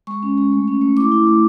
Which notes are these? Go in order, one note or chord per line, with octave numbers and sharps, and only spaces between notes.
G#3 C#6
C#4
G#3
A3
C#4
A3
E4 D6
E4
A3